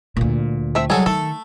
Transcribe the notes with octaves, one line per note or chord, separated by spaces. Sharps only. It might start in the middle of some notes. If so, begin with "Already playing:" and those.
D2 A#2
A3 C4 E5
C2 F#3 G#3 G#4 A4
D#3 A3 A4